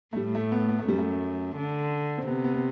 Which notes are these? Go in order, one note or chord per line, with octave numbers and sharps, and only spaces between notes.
A3
A2 G3
A3
B3
B3
A3
F#2 G3
A3
D3
C4
C3 B3
B3
B3